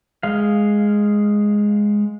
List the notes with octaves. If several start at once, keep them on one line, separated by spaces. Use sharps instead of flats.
G#3 F5